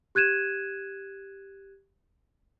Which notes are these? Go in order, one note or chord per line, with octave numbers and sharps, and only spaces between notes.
G4 F#6 G#6 D#7 E7